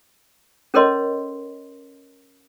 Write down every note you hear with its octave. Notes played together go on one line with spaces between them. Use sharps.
C#4 A4 A#4 C#5 D#5 C6